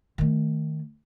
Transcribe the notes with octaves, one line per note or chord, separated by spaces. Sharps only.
D#3 A3